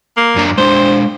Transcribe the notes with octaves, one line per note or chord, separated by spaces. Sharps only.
A#3
F#2 D4 A#5
G#3 D4 C5